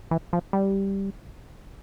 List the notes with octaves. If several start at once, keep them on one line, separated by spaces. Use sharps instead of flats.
E3
F3
G3